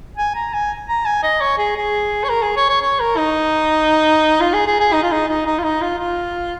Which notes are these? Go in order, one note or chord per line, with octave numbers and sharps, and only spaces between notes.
G#5
A#5
G#5
A#5
G#5
D#5
C#5
G#4
G#4
C#5
A#4
G#4
C#5
C#5
C#5
A#4
D#4
F4
G#4
G#4
G#4
D#4
F4
D#4
D#4
D#4
F4
D#4
F4
F4